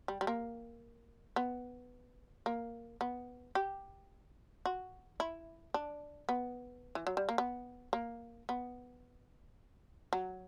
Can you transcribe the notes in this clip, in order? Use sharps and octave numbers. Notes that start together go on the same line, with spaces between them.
G3
G3
A#3
B3
A#3
B3
G4
F#4
E4
D4
B3
E3
F#3
G3
A#3
B3
A#3
B3
F#3